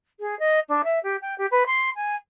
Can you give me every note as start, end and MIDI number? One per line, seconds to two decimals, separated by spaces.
0.20 0.37 68
0.39 0.59 75
0.68 0.82 62
0.84 0.99 76
1.03 1.16 67
1.21 1.34 79
1.38 1.46 67
1.51 1.63 71
1.66 1.90 84
1.95 2.15 80